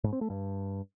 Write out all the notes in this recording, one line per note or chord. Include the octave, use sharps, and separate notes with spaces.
G#2
C4
A3
G2